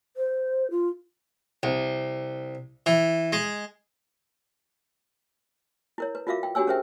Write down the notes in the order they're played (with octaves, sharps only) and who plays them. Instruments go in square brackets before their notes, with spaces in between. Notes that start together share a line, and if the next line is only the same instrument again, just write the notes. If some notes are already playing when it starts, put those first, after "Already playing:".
[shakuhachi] C5
F4
[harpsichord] C2
E3
G#3
[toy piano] E4 A#4 C#5
B4
F4 F#4 A#4 E5 F5 D6
G5
D4 F#4 G4 C#5 G#5 E6
C#4 G#4 A#4 C5 E5 G5